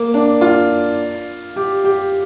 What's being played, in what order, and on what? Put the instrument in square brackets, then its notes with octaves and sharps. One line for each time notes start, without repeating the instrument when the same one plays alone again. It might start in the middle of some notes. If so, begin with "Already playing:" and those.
Already playing: [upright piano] A#3
D4
F4
G4
G4